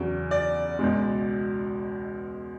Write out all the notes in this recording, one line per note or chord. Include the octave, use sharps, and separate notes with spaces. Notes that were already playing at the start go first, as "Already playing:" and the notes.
Already playing: E2 C#3 F#3
D5
C#2 B2 G#3